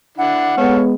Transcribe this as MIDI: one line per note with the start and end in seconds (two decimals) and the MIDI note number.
0.18 0.53 50
0.18 0.53 62
0.18 0.53 64
0.18 0.75 78
0.57 0.95 56
0.57 0.95 59
0.57 0.81 69
0.57 0.81 73
0.57 0.81 77